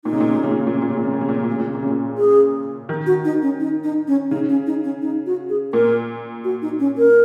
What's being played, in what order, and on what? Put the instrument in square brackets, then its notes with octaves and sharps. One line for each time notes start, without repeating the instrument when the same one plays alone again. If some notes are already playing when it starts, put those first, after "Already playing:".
[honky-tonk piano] A#2 [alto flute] D#4
[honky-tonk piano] C#3
A#2
C#3
A#2
C#3
A#2
C#3
A#2
C#3
A#2
C#3
A#2
C#3
A#2
C#3
A#2
C#3
A#2
C#3
A#2
C#3
A#2
C#3
A#2
[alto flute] G#4
[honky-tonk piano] D#3
[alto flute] F#4
D#4
C#4
D#4
D#4
C#4
[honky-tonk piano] C#3 [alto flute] D#4
[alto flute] C#4
D#4
C#4
D#4
F#4
G#4
[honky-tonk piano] A#2 [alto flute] A#4
[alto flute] F#4
D#4
C#4
A#4